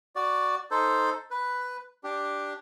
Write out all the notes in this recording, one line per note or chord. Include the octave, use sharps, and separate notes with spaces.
F#4 D5
D#4 A4 C5
B4
D4 G4